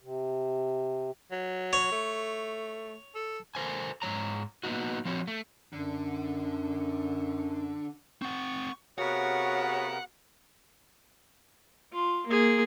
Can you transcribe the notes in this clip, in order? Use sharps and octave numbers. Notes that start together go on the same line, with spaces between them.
C3
F#3
C#5
A3
A4
A4 A#4 C5 G#5
G#2 G#3 C#5 A#5
A#3 B3 D#4 F#4
F3 C4 F#4 C#5
A3
F#2 D3
C4 F#5 C#6
C3 B3 F#4 G#4 A#4 C#5 F5 F#5
F4
A#3 G#4